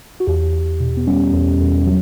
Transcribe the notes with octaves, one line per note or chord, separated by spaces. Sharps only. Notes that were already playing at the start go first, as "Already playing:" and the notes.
F#4
E2 G4
E2
B2
B3
G3 C#4
E2
E2
F#3